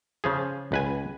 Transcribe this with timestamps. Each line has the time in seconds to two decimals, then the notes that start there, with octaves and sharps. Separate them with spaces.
0.24 C#3 F3 G#4
0.72 C#2 B4 G#5